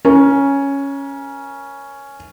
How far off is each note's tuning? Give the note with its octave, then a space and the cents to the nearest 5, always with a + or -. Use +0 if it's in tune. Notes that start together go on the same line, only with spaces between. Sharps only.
C#4 +0 A#4 +35